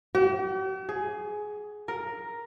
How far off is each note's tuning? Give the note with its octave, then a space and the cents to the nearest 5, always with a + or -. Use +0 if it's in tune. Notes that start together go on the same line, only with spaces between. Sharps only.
G4 -45
G#4 +15
A#4 +5